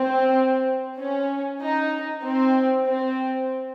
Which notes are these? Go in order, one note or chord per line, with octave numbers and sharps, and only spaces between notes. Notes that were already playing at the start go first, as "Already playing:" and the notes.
Already playing: C4
C#4
D#4
C4
C4